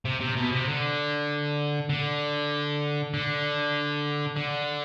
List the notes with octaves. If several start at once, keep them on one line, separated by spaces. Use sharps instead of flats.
C3
C3
B2
C3
D3
D3
D3
D3